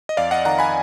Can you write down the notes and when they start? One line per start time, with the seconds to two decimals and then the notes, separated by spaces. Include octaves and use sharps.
0.09 D#5
0.17 F2 D5 F5
0.31 D#5 F#5
0.45 D#3 F#5 A#5
0.59 G#5 B5